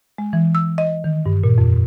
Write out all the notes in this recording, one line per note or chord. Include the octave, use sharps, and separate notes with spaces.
G#3
E3
E6
D#5
D#3
G2
A#2
F2